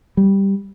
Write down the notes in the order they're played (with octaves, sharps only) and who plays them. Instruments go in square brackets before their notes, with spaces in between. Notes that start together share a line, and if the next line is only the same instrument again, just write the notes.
[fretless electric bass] G3